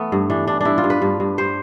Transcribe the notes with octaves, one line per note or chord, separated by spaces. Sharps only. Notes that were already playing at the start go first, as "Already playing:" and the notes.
Already playing: E3 A3 B3
G2
E3 D4
G2 D4
G2 D4 E4
F4
G2
B4
G2
G2
G3 C5